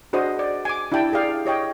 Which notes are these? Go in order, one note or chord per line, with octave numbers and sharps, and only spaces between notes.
D4 F#4 G#4 C5 D#5 D#6
D5
G#5 D6
D4 E4 G4 G5 A5
G4 G#4 D5 F5 G5
G4 C#5 D#5 G5